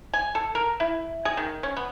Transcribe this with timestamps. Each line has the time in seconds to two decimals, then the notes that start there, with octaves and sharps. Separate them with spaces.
0.13 G#5
0.35 A4
0.55 A#4
0.80 E4
1.25 G#4
1.37 D#3
1.63 C#4
1.77 B3